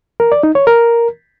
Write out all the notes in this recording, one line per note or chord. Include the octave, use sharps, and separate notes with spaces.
A#4
D5
D#4
C#5
A#4